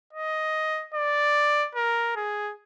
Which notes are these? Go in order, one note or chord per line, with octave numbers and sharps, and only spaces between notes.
D#5
D5
A#4
G#4